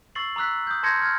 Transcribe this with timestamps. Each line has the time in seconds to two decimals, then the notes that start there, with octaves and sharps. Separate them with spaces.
0.15 C#6 E6 A6 C7 F#7
0.36 A#5 D6 E6 F#6 B6
0.67 D#6 G6
0.83 A5 C6 G6 G#6 A#6 C#7
1.01 F6 G#6